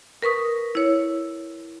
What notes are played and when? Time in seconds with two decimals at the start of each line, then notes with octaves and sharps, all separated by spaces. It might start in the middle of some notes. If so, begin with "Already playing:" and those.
0.22 A#4 B4 C#6 D#6
0.75 E4 C#5